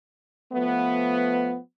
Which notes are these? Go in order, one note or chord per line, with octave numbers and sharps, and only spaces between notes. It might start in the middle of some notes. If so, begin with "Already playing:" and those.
F3 A3 B3